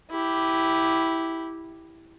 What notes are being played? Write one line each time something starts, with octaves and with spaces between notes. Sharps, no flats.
E4 G4